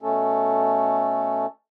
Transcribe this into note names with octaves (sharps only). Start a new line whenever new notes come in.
B2 A3 C#4 A4